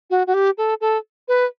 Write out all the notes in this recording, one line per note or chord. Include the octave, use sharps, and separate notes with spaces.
F#4
F#4
G4
A4
A4
B4